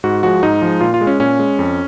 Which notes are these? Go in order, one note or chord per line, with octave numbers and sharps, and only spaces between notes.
G#2 F#4
F3 G#3 F#4
G#2 D#4
F3 G#3
A#2 F4
F4
G#3
C#4
A#2 C#4
G#3
F2